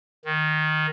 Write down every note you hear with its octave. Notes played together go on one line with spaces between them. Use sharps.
D#3